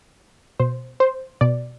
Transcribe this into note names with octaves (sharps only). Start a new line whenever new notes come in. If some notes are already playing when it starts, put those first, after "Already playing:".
B2 C5
C5
B2 D5